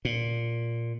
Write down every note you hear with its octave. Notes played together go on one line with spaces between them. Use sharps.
A#2